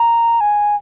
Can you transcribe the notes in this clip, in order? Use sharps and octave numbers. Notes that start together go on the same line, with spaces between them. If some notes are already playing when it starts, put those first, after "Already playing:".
Already playing: A#5
G#5